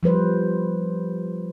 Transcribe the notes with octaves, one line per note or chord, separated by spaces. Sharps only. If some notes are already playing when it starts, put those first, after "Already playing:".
F3 G3 B4 C5